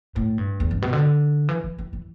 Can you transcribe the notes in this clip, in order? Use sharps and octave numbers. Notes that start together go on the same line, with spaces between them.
A2
G2
E2
G2
B2
D3
E3
E3
E3
E3